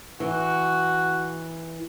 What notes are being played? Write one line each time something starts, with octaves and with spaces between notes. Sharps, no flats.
E3 F#4